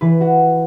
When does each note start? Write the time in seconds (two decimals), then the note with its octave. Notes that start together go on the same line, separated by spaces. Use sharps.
0.01 E3 B4
0.21 F#4